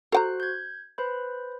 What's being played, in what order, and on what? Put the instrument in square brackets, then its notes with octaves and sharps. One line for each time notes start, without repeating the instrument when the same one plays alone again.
[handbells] F#4 C5 F#6 [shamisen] A4 F#5 A#5
[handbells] G6 G#6
B4 C5 B5